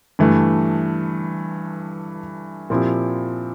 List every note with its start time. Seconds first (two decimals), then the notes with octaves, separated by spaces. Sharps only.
0.19 G2 E3 A3
2.70 A#2 F3 C4 E4 G4